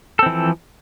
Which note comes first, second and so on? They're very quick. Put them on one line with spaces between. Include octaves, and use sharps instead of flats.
A4 C4 E3 F3